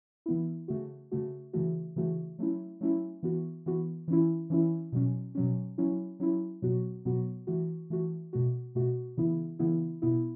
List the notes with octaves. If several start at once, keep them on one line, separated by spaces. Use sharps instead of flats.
E3 B3 E4
C#3 A3 F#4
C#3 A3 F#4
C#3 E3 A3 F#4
C#3 E3 A3 F#4
F#3 A3 C#4 E4
F#3 A3 C#4 E4
E3 B3 F#4
E3 B3 F#4
E3 C#4 E4
E3 C#4 E4
B2 F#3 C#4
B2 F#3 C#4
F#3 C#4 E4
F#3 C#4 E4
B2 F#3 B3 F#4
B2 F#3 B3 F#4
E3 A3 F#4
E3 A3 F#4
B2 A3 F#4
B2 A3 F#4
C#3 E3 B3 E4
C#3 E3 B3 E4
B2 B3 E4